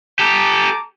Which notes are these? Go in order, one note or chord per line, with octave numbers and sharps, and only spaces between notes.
G4 A4 A5 A#5 D6